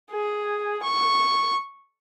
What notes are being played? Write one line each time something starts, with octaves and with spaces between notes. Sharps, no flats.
G#4
C#6